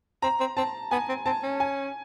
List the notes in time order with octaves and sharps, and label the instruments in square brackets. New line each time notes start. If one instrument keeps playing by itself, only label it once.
[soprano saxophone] C4 [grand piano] A#5
[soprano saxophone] C4
[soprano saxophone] C4 [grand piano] A5
[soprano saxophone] B3 [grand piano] G#5
[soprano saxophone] C4
[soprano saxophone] C4 [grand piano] A5
[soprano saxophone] C#4
[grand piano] G#5